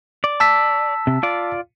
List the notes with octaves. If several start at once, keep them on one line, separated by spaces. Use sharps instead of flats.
D5
A5 E6 B6
C3
F4 D5